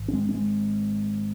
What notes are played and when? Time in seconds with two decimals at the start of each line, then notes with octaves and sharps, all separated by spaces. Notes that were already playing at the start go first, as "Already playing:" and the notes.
Already playing: G#1
0.08 C#4
0.13 G#3 C4
0.29 C#4
0.34 G#3 C4